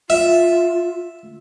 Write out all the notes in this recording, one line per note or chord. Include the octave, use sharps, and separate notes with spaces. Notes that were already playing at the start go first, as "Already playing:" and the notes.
F4 E5